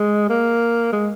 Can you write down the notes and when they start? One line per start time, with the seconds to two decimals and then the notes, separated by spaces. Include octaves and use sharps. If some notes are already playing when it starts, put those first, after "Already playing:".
Already playing: G#3
0.29 A#3
0.92 G#3